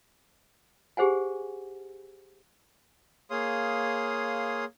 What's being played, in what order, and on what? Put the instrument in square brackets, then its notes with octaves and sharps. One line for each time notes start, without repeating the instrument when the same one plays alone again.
[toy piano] G4 G#4 C5 F#5 G#5
[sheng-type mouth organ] A#3 G#4 C#5 F5 C6 D#6